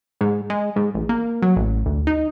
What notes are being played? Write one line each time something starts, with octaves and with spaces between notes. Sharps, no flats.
G#2
G#3
G#2
A1
A#3
F#3
A1
D2
D#4